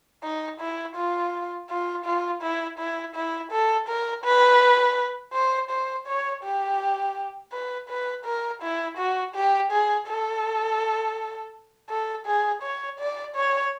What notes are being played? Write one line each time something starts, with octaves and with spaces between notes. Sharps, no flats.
D#4
E4
F4
F4
F4
E4
E4
E4
A4
A#4
B4
C5
C5
C#5
G4
B4
B4
A#4
E4
F#4
G4
G#4
A4
A4
G#4
C#5
D5
C#5